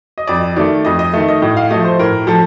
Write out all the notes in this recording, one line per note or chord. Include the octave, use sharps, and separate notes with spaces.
D#5
F2 D5
D#3 A3 D5
F2 D#5
D#5
D#3 A3
D#5
A2 D#5
F5
F3 A3 D#5
C5
A2 A#4
F3 A4